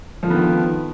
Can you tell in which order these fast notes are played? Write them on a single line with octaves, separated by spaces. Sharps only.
F3 D3 B3 D#3